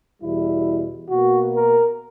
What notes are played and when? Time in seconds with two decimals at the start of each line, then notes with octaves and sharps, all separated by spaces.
0.22 E2 B2 G3 E4
1.08 B2 A#3 F#4
1.53 A#4